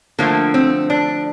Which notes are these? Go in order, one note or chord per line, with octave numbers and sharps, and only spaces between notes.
D3 F3 A3 A#3
C4
D4